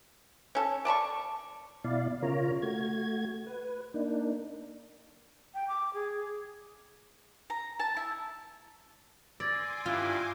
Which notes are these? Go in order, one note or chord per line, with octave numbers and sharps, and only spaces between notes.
C#4 A4
D5 A5 B5 C#6
B2 E4 D5 F5
C#3 F4 A#4 C#5 A#5
A3 F#4 G#6
B4
A#3 D4 D#4
G5
D6
G#4
A#5
A5
E4
D5 G#5 C6 D6 E6 G#6 A#6
G2 E4 F4 F#6 G6 G7